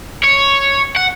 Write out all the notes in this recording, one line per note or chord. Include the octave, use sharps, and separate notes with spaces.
C#5
F#5